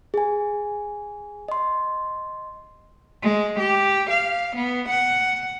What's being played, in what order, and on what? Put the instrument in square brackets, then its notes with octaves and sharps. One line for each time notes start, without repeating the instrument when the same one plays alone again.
[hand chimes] G#4 G#5
D#5 C6
[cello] G#3
G4
F5
B3
F#5